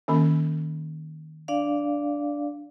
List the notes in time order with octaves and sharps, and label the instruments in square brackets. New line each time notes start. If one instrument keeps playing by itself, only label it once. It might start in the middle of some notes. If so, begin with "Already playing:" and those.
[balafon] D#3 A#3 C#4
[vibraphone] D4 D5 F5